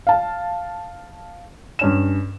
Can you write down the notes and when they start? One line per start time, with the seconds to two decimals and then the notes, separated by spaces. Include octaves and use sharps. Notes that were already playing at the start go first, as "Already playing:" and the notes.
0.07 F5 A5
1.79 G2 C#4 E7